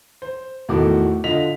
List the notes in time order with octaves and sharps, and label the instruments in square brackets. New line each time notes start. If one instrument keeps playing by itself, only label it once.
[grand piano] C5
E2 A2 D#3 F#4 A4 D6
D3 F4 D#5 B6 F7